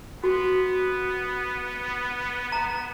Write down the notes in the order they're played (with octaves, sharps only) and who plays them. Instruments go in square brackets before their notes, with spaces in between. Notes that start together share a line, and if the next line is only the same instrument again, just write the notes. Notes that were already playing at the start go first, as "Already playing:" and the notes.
[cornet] B3 [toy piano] F#4
[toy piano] A#5